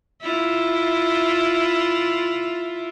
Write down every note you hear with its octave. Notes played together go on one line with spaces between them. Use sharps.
E4 F4